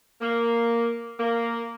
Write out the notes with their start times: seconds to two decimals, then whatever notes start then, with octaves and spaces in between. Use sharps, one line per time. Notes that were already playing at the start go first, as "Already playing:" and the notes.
0.21 A#3
1.19 A#3